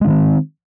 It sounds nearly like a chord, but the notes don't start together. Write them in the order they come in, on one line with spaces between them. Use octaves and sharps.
G#3 C#4 D#3 C4